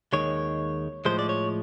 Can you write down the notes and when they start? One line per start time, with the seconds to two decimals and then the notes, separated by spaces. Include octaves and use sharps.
0.13 D#2 D#3 G#3 C#5
1.05 A2 F3 G#3 C5
1.19 D5
1.29 C#5